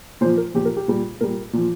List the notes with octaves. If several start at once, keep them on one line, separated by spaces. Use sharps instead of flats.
A#2 F3 C5
A#4
A#2 F3 G4
A#4
G4
A#2 G3
A#2 G3 A#4
A#2 F3